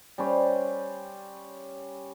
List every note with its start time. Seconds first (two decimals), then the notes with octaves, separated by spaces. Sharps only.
0.18 G3 C#4 C5